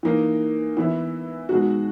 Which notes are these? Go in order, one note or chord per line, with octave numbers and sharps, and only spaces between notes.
E3 A#3 D#4
E3 B3 E4
B2 G#3 D#4 F#4